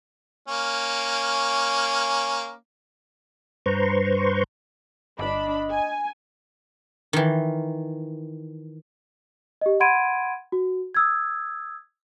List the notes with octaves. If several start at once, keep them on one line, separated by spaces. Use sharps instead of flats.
A#3 C#4
G2 B4 C5 A#5 C6 C#6
G1 D4 D#5 B5
G#5
D#3 E3
G4 D#5
F#5 B5 C6 G#6 D7 D#7
F#4
D#6 E6 G#6